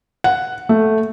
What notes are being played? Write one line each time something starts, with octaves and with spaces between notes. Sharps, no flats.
F#5
A3